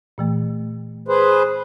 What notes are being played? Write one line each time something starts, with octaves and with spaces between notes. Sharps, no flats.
A#2 E3 A3
G#4 B4 C5